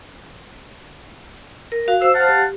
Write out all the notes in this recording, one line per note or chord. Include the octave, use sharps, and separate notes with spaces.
A#4
F#4 F5
C5 E6
F5 F#5 A5
G4